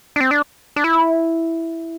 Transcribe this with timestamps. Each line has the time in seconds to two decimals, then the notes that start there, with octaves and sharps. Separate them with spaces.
0.16 D4
0.21 C4
0.31 D4
0.76 D4
0.84 E4